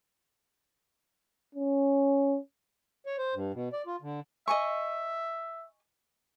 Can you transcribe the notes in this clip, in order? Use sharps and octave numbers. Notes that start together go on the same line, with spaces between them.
C#4
C#5
C5
G2
B2
D5
F4
D3
D#5 E5 G#5 C#6